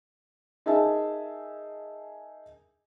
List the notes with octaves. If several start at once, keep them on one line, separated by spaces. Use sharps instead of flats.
D#4 G#4 A#4 E5 G#5 A5